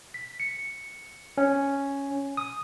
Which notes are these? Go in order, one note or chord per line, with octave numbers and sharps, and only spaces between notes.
B6
C#7
C#4
D#6